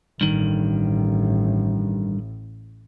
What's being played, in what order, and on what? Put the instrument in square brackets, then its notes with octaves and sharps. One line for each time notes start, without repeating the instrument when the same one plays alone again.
[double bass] A1 [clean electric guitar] G2 D#3